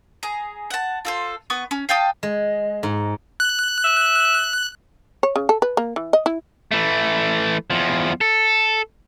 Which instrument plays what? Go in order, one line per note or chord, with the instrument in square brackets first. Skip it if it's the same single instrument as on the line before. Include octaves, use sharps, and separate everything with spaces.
[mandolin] G#4 A#5
F#5 A5
F4 A4 C5
B3 C#6 D#6
C#4
F5 G5 A5 D#6
[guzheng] G#3
G#2
[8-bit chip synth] F#6
[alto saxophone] E5
[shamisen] C#5
C#3
A4
B4
A#3
E3
D#5
E4
[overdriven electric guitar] E3 A3
E2 F3
A4